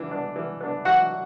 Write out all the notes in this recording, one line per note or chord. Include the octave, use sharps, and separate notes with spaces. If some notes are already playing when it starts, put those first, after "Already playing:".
Already playing: E3 B3 D4
B3 D4
E3
B3 D4
E3 F#4 F#5